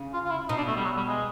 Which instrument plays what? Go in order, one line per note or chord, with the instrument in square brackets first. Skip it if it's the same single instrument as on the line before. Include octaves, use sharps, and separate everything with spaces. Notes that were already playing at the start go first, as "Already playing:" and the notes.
Already playing: [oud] C#3
[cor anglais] F4
F4
E4
[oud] B2 [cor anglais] D#4
[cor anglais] D4
A3
G3
F#3
G3
G#3